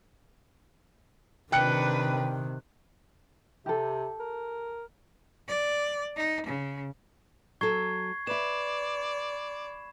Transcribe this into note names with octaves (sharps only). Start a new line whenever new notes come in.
C3 D#3 D4 B4 G5 F#6 C#7
C3 G4 A4
A#4
D5
D#4
C#3
F#3 A4 C#6 G#6 C7
B4 D5 E5 B5 E7